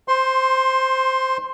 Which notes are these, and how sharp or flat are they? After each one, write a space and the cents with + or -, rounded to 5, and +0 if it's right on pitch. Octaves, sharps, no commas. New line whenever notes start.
C5 +0 C6 +20